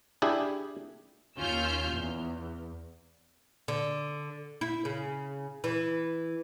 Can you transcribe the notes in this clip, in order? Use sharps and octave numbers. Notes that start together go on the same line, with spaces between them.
D4 E4 G4 G#4
D#2 C#4 F4 E6 F6 G6
E2
D3
E4
C#3
E3